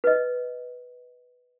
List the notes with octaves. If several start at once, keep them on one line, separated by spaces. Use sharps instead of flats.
B4 D#5